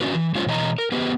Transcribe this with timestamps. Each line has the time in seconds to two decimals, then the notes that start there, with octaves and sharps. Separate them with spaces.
0.01 C#4 D4 F#4 B4
0.15 E3
0.35 G#3 C#4 D4 F4 C5 C#5
0.47 B2 E3 C#5 D#5 A#5
0.78 A#4
0.92 B3 G4 B4 C5